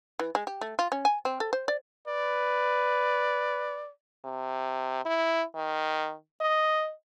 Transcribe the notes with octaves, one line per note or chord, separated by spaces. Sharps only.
E3
G#3
G4
A3
F4
C#4
G#5
C4
A4
C5
D5
B4 D5
C3
E4
D#3
D#5